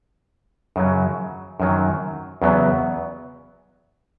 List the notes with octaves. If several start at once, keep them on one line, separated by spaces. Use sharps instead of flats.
F#2 C#3 F#3
F#2 D#3 F#3
E2 C#3 F#3 B3